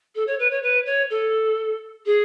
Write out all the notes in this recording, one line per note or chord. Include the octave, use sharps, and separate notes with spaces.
A4
C#5
B4
C#5
B4
C#5
A4
G#4